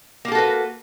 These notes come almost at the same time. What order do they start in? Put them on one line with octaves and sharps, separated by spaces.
A#3 G4 A4 F#4 B4